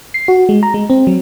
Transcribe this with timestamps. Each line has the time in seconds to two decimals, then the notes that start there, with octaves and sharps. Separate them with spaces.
0.14 C7
0.28 F#4
0.49 G#3
0.63 A#5
0.74 G#3
0.90 C4
1.07 F#3